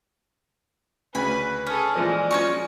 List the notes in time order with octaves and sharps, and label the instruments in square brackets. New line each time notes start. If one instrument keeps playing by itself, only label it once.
[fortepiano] D2 C#3 [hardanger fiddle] B4 [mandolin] G#5 B5
[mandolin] C#4 [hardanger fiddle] G#4 A4
[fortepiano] A#2 E3 F3 [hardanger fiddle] G#3 D5
[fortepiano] F3 F#3 [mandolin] C#4 D#4 C#6